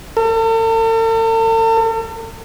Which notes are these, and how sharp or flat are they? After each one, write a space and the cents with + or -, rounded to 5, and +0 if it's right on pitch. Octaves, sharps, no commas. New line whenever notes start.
A4 +45